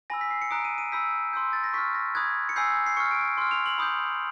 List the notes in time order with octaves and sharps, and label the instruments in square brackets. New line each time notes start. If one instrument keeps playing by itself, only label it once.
[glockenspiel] G#5 B5 E6 A#6
B6
C7
C#7
A#5 D#6 F#6 D7
D#7
D#7
B5 E6 G6 B6
C6 E6 G6
A6
A#6
C#6 F6 B6
A#6
B5 D#6 F#6 G#6
C#7
G#5 B5 E6 G6 C7
C7
C#6 F6 C#7
D7
C6 F6
F7
F#7
B5 D#6 G6